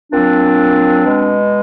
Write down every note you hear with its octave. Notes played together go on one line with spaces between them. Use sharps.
A#2 F#3 C4 D4
B2 G#3